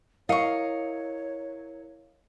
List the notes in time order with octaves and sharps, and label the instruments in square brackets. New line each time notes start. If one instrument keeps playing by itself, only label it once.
[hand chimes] E4 A#4 C#7 [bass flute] C#5 [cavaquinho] D#5 C#6 [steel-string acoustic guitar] F5